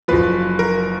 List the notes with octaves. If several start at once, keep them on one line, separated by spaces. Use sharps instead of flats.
F#1 F#2 F3 B4
A#4